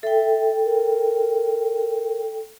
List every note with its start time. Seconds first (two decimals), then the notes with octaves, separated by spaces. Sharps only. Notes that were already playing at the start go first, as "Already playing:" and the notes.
0.03 A4 E5 G5
0.65 A#4